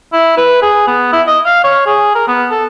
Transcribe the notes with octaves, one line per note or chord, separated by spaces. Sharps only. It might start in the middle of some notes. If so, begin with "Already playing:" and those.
E4
B4
G#4
B3
E4
D#5
F5
C#5
G#4
A#4
B3
A4